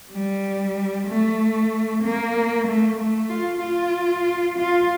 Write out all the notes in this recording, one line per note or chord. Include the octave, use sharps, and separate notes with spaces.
G3
A3
A#3
A3
A3
F4
F4
F4